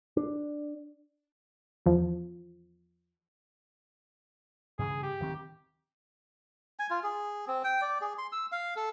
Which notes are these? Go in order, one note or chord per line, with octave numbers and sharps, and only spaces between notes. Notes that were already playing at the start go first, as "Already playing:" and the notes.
D4
E2 F3
G2 C#3 E3 G#4
G4
D1 D#3 C4
G#5
F4
G#4
C4
G5
D5
G#4
C6
E6
F5
A4